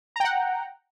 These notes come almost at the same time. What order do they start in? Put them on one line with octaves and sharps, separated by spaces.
A#5 G5 F#5